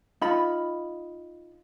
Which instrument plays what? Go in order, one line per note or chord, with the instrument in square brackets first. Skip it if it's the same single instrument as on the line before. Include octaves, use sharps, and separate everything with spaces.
[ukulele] D#4 F4 B5